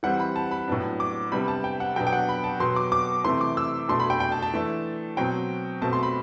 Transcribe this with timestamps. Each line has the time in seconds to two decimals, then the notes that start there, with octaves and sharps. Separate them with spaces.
0.03 E3 G3 C4 F#5
0.20 B5
0.36 A5
0.51 B5
0.68 A2 F#3 B3 D4
1.00 D6
1.32 C3 G3 B3 D4 B5
1.48 A5
1.64 G5
1.80 F#5
1.96 B2 F#3 B3 D4 G5
2.07 G5
2.13 F#5
2.29 B5
2.44 A5
2.60 B2 F#3 B3 C6
2.76 D6
2.92 D6
3.24 C3 E3 A3 C6
3.41 D6
3.57 E6
3.89 B2 A3 D4 C6
4.00 B5
4.10 G5
4.20 G5
4.32 A5
4.42 A5
4.54 E3 A3 D4
5.17 B2 F#3 C4 G5
5.82 B2 A3 C4 A5
5.93 C6
6.03 B5